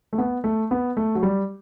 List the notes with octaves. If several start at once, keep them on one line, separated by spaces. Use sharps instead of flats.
A3
B3
A3
B3
A3
F#3
G3